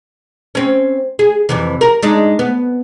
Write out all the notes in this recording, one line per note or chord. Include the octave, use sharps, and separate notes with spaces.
C4 C#4
G#4
F2 C3 E3
A#4
G#3 D4 D#4
B3